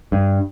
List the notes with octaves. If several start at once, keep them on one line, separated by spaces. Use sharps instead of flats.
G2